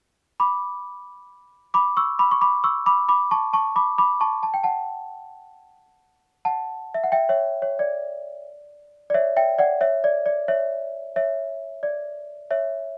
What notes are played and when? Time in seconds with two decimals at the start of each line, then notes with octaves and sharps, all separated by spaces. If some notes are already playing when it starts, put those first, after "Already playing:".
0.40 B5 D6
1.74 B5 D6
1.97 C#6 E6
2.19 B5 D6
2.31 C#6
2.41 B5 D6
2.64 C#6 E6
2.86 B5 D6
3.09 B5 D6
3.31 A5 C#6
3.53 A5 C#6
3.76 B5 D6
3.98 B5 D6
4.21 A5 C#6
4.43 A5
4.54 G5
4.63 F#5 A5
6.45 F#5 A5
6.94 E5
7.04 F#5
7.12 E5 G5
7.29 C#5 E5
7.62 C#5
7.79 D5
9.10 D5
9.14 C#5 E5
9.37 E5 G5
9.59 D5 F#5
9.81 C#5 E5
10.04 D5
10.26 D5
10.48 C#5 E5
11.16 C#5 E5
11.83 D5
12.51 C#5 E5